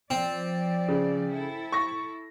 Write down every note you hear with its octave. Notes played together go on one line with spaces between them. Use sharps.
F3 C4 D5
C#3
E4 A4
C#6 A#6